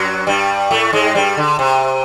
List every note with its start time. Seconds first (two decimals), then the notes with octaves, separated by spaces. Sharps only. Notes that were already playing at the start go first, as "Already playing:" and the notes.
Already playing: F#2 F#3
0.27 G2 G3
0.71 A2 A3
0.93 G#2 G#3
1.15 G2 G3
1.37 D3
1.59 C3